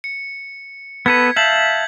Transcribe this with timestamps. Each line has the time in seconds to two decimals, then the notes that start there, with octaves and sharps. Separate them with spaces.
0.04 C#7
1.06 B3 A4 B4 G#6 B6
1.36 E5 F5 A5 G6 F#7